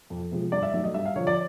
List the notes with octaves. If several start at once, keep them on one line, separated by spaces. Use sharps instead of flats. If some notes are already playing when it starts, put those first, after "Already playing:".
F2
C3 F3 G#3
G2 D5
E5
D#3 F#3 A3 D5
D#5
G2 E5
F5
D3 F3 C#5
D5